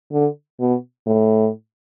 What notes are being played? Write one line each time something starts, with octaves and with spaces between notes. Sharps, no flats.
D3
B2
A2